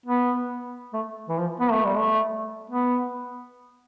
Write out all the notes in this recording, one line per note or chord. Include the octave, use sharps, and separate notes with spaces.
B3
A3
E3
F3
B3
A3
G3
A3
B3